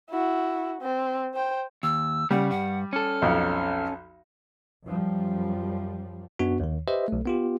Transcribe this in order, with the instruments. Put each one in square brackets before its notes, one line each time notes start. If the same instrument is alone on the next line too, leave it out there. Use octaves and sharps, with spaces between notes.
[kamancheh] E4 F#4
C4
C5 G5
[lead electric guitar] D#2 [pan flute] E6
[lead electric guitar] C#3 [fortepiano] G3 [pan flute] F#5
[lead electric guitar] G2 [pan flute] F#5
[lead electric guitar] C#4 A4 [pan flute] F6
[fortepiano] B1 F2
[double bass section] F#2 F3 G3
[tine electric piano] F#2 B3 D4 F#4
D#2 D#3
G4 B4 C5 D#5 E5
B1 A3
B3 F4 G4